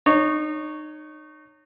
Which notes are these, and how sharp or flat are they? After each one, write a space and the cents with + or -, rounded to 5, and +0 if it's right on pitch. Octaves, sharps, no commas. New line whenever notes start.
D#4 -30 C#5 +0